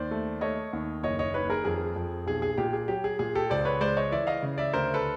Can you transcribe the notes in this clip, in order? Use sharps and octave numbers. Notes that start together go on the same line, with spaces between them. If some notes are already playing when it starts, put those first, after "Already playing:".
Already playing: D#2 C5 D5
A3
A3 C#5 D#5
D#2
F#1 C#5 D#5
C#5 D#5
D#3 B4 C#5
G#4 A#4
F2 G#4
F2
B1 G#4
G#4
A#2 G4
G#4
F#3 G4
G#4
A#2 G#4
G4 A4
C#2 C5 D5
B4 C#5
G#3 C5 D5
C#5 D#5
E3 D5 E5
D#5 F5
C#3
D5 E5
D2 A#4 C5
A4 B4